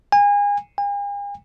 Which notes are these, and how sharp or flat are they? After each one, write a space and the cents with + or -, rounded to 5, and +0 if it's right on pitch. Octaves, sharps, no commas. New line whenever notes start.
G#5 -30
G#5 -45